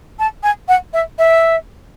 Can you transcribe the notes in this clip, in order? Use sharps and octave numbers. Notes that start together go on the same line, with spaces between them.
A5
G#5
F#5
E5
E5